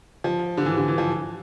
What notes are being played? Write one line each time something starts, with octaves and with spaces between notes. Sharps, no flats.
F3
D3
E3
D3
E3
F3